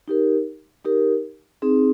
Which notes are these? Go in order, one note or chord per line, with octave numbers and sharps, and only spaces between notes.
D#4 G4 A#4
D#4 G4 A#4
C4 D#4 G#4